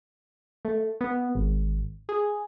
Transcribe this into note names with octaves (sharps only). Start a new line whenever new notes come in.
A3
B3
G#1
G#4